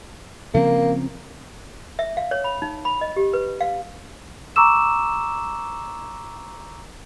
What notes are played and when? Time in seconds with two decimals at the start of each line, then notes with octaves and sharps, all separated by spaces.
0.54 C#3 F3 A#3 C4
1.99 E5
2.17 F5
2.31 C#5
2.44 B5
2.62 D#4
2.85 B5
3.01 D#5
3.16 G4
3.33 B4
3.61 F5
4.56 A#5 C#6 D6 E6 E7